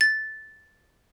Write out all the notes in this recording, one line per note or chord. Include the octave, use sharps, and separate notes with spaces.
A6